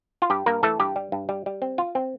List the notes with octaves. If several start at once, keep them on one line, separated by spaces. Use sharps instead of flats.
F4
G2 G4
G2 A#3 A#4
E3 A3 A4
G2 G4
G3
G2
G3
G3
C4
F4
C4